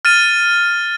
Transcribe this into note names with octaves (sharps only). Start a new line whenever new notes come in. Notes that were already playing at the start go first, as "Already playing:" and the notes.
F6 A6 D#7